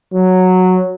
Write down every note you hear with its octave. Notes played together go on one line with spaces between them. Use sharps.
F#3